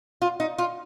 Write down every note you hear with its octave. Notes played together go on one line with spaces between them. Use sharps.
F4
D#4
F4